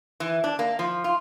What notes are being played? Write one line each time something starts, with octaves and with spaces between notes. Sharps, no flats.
E3
D4
A#3
F3
F4